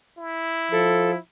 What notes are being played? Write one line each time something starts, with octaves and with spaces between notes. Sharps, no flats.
E4
F3 A4